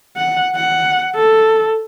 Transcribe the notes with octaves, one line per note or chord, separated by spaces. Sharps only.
F#5
F#5
A4